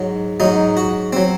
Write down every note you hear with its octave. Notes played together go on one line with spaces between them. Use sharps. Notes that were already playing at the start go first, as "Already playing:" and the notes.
Already playing: G#2 F#3
G#2 F#3 D#4
F#4
F#3 C4